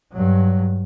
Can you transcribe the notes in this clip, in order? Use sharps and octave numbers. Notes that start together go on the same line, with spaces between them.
G2 F#3